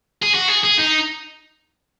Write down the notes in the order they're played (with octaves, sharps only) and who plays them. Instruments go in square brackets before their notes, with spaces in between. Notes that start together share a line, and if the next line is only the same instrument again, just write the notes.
[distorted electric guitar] G#4
F#4
G#4
G#4
D#4